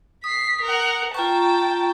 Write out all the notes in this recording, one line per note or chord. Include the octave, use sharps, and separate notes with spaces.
D#6 B6 C7
A#4 F#5
F4 G5 A5 A#5 C#6